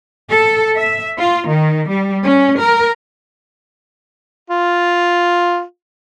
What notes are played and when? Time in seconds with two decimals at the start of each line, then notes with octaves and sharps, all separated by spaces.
0.29 A4
0.76 E5
1.18 F4
1.48 D#3
1.87 G3
2.24 C#4
2.61 A#4
4.50 F4